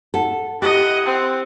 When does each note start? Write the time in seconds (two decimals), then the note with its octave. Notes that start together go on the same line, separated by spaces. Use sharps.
0.14 A4 F#5 A5
0.62 E4 G4 D#5 F#5 F#6
1.06 C4